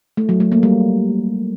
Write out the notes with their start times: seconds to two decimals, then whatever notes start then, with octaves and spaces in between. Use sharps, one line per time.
0.17 A3
0.29 F#3
0.40 A3
0.52 A#3
0.63 G3